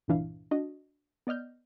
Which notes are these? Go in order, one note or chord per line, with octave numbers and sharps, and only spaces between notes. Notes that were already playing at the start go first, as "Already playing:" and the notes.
C2 G2 A#2 E3 D4 F5
D4 F#4 D#5
B3 D5 D#5 F6 G6